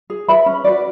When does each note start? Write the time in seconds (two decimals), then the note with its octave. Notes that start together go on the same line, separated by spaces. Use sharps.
0.10 G#4
0.28 B4 E5 B5
0.46 C#4
0.65 F#4 B4 D5